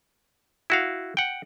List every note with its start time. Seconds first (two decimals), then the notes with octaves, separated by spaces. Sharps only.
0.70 E4 F#4 F5
1.17 F#5 G5